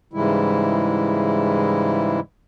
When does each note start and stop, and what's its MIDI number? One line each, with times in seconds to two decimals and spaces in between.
0.13 2.20 44
0.13 2.20 49
0.13 2.20 52
0.13 2.20 55
0.13 2.20 56
0.13 2.20 64